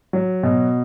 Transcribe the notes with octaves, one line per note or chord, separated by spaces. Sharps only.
F#3
B2